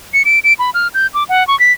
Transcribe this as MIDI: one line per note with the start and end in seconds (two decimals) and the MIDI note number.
0.14 0.23 97
0.25 0.39 98
0.44 0.53 98
0.59 0.70 83
0.74 0.88 89
0.94 1.07 91
1.14 1.24 86
1.29 1.46 78
1.48 1.58 85
1.60 1.72 95